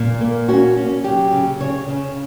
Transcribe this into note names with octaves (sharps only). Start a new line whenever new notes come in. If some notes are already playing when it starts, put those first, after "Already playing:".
Already playing: A#2
A#3
C#4 F#4
C#4
F#3 G4
C#3
C#3 C#5
C#3